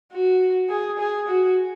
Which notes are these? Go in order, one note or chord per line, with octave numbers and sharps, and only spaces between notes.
F#4
G#4
G#4
F#4